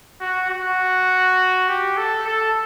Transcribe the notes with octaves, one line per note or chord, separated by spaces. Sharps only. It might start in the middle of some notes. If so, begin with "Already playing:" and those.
F#4
F#4
G4
A4
A4